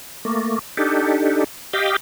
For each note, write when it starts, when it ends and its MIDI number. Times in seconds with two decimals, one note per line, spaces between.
0.25 0.59 57
0.25 0.59 58
0.77 1.44 62
0.77 1.44 63
0.77 1.44 67
0.77 1.44 69
1.73 1.96 67
1.73 1.96 75
1.73 1.96 77
1.73 1.96 79